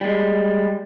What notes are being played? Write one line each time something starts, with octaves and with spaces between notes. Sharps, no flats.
G3 G#3